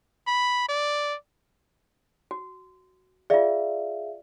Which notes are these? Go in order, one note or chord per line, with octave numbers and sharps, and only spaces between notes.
B5
D5
F#4
F4 G#4 D5 E5 F5